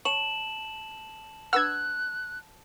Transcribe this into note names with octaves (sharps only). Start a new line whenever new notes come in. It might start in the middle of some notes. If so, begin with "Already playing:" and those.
C#5 A5 E7 F#7
D4 B4 F#5 E6 F#6 G#6